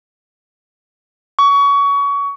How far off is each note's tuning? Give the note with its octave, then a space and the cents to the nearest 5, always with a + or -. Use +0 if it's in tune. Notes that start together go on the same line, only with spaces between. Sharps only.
C#6 +25